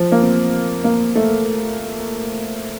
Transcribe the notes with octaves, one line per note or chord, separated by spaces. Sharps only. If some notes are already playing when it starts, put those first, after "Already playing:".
Already playing: F3
A#3
C4
A#3
A3